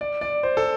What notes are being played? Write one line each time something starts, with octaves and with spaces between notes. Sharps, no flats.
D5
D5
C5
A4